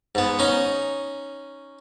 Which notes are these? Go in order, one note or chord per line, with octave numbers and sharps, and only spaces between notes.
G#2 B3
C#4 D#4